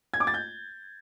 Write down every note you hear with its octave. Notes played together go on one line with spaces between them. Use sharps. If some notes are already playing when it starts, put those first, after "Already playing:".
G#6
D6
A6
G6